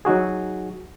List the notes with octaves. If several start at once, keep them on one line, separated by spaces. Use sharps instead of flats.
F#3 D#4 F#4 G#4